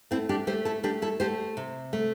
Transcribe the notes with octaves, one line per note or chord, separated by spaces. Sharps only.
A3 C4 E4
D4 G4
A3 G4 C5
E4 A4
A3 D4 G4
E4 A4
A3 G4 C5
C3
A3